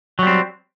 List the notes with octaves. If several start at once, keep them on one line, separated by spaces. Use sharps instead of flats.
F#3 G3 C4